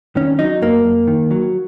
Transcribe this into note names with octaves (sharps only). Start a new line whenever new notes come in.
D#3 C#4
F#3 D#4
F#2 A#3
F#2
D#3
F#3